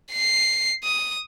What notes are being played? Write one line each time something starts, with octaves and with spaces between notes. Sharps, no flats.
C7
D#6